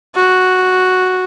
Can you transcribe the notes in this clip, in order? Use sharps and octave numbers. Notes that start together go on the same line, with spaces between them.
F#4